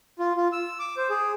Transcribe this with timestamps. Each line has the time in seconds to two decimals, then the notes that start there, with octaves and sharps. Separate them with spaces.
0.19 F4
0.37 F4
0.52 E6
0.79 D6
0.97 C5
1.10 G#4